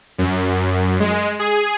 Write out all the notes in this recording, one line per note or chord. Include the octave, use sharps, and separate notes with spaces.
F#2
G#3
G#4